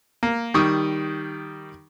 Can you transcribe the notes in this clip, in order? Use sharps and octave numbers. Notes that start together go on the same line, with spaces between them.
A#3
D#3 G3 C#6 D#6